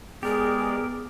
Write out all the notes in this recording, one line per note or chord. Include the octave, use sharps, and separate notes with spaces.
G#3 B3 G4 G#4 A#4 D5